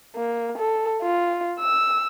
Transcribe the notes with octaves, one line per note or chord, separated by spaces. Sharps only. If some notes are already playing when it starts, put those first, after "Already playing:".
A#3
A4
F4
E6